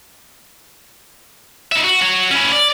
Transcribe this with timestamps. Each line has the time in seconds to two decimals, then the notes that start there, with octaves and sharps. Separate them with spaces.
1.72 D#4 E5
1.84 F#4
2.01 F#4 C#5
2.31 C#4 E4
2.52 D5